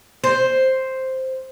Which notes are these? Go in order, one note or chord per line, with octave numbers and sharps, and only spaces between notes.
C5